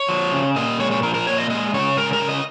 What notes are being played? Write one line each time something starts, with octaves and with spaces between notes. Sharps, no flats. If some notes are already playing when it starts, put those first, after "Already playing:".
Already playing: C#5
F3
C#3
A#2 D#5
G#3 C#5
C#5
F3 A#4
A#4
A#2 C#5
D#5
G#3 D#5
C#3 C#5
G#3 A#4
A#4
C#3
D#5